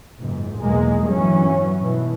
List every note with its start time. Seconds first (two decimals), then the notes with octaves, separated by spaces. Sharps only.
0.18 F#1 C#2 G#2
0.58 B1 E2 G#3 A#3
1.10 G1 G2 E3 F#3 C#4
1.80 G#2 B2 E3